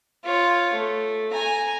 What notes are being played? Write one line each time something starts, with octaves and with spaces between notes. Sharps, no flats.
F4 C#5
A3
G#5 A#5